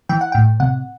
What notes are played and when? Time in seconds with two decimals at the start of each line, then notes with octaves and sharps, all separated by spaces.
0.09 E3 G5
0.21 F#5
0.32 A2 G5
0.60 C3 F#5